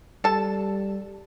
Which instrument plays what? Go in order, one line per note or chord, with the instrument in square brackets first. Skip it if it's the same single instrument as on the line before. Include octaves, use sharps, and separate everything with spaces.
[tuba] G3 [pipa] A4 A5